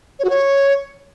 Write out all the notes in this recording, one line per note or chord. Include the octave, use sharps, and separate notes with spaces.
C#5
F#4
C#5